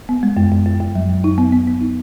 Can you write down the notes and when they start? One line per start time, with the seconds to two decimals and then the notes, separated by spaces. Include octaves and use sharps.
0.09 B3
0.23 G#3
0.37 F#2
0.52 F#2
0.65 F#2
0.81 F#2
0.95 F#3
1.09 F#2
1.24 D#4
1.38 B3
1.52 B3
1.68 B3
1.81 D#4